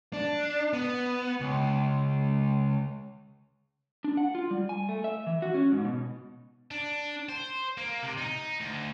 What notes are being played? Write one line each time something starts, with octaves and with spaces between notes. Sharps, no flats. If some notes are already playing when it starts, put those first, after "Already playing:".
D4
B3
C#2
D4
F#5
F4
G3
G#5
A3
E5
E3
F#4
C#4
G#2
B2
D4
C5
A#3
C3
D#4
D2